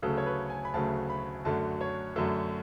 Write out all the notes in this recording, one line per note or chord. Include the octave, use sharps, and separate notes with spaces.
D2 C#3 F#3 A3 A4
C#5
B4
G#5
B5
D2 C#3 F#3 A3 A5
B5
F#2 D3 F#3 A3 A5
C#5
F#2 D3 F#3 A3 A4